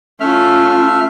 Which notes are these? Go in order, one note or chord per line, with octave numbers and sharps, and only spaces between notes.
A3 C#4 F4 E5 F6